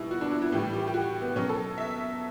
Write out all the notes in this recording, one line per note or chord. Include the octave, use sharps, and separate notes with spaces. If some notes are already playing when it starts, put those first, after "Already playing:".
Already playing: B2 G3 E4
F#4
D4
E4
E4
A2 E3 G3 G4
G4
G4
F#4
B3
B2 F#3 C#4
A4
E5